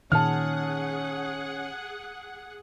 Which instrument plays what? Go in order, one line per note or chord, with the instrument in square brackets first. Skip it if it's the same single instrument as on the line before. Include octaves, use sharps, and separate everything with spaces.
[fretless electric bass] A#2 D#3 [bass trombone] C#4 [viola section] G#4 F#5 [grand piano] A5 F6